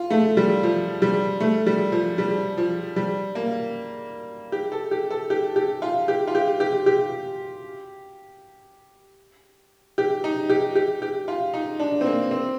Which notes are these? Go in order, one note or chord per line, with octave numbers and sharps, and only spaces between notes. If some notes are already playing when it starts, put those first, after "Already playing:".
Already playing: F4
A3
G3
F3
G3
A3
G3
F3
G3
F3
G3
A#3
G4
A4
G4
A4
G4
G4
F4
G4
F4
G4
G4
G4
G4
D#4
G4
G4
G4
F4
D#4
D4
C4
A#3
C4